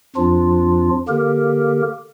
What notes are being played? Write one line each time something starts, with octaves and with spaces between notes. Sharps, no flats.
F2 F3 D4 F4
D3 A#3 G4 A#4